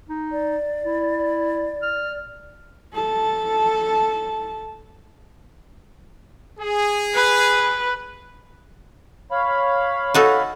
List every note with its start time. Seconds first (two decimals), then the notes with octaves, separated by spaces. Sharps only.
0.10 D#4
0.32 D5
0.84 E4
1.82 F6
2.94 A4 A5
6.59 G#4
7.14 B4
9.31 C#5 F5 B5
10.14 D#4 F#4 A4